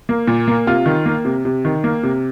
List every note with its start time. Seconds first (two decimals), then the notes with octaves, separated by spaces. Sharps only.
0.09 A#3
0.27 A#2
0.48 A#3
0.67 C3 F4
0.86 D#3
1.06 A#3
1.25 C3
1.45 C3
1.65 D#3
1.84 A#3
2.03 C3